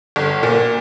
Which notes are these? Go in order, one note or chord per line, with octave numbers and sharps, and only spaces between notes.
G1
A#2